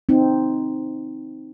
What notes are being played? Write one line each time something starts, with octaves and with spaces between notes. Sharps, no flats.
C4 D#4